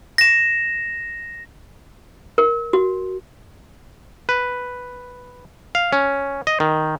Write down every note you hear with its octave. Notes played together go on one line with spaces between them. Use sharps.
A#6 E7
A#4
F#4
B4
F5
C#4
D#5
D#3